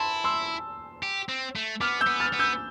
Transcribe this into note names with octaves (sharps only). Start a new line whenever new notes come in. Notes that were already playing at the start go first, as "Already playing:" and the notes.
Already playing: E4 A5 C6
C6 E6
G4
C4
A3
B3 D6 F6
E6 G6
B3
F6 A6
B3
E6 G6